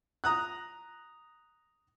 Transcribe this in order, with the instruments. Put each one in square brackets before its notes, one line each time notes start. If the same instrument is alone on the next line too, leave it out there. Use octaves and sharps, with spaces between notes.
[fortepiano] A#5 D#6 F#6